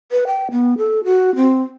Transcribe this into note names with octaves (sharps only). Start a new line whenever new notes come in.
B4
G5
B3
A4
F#4
C4